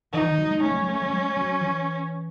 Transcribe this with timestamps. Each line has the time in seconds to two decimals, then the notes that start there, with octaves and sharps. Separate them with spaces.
0.13 E3 D#4
0.26 D#3
0.38 F#3
0.51 G#3
0.63 A3 C#4
0.72 F#3
0.79 G#3
0.88 A3
1.02 F#3
1.12 G#3
1.37 F#3
1.61 E3